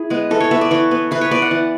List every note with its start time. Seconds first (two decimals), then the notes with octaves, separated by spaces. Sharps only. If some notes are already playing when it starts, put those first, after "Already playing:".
Already playing: E4 G#4
0.10 G#3 B3
0.31 E3 A4
0.40 C#5
0.51 B3 E5
0.61 D5
0.71 E3 C#5
0.91 B3
1.11 E3 B4
1.21 C#5
1.31 B3 D5
1.42 F#5
1.51 E3